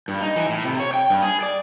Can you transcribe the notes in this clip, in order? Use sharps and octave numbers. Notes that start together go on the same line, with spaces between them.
G2
D#4
E3
A2
C3
C#5
G5
G2
G#4
D5